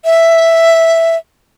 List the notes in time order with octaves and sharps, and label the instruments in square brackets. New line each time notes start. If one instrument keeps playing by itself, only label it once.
[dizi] E5